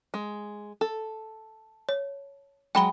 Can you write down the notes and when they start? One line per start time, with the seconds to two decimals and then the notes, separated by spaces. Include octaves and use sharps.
0.14 G#3
0.81 A4
1.89 C#5
2.75 F#3 G#3 G5 B5 G7